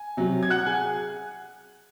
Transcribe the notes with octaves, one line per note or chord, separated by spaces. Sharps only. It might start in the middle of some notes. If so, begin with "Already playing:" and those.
Already playing: G#5
C3 F#3
G#6
F#5 F#6
G#4 G#5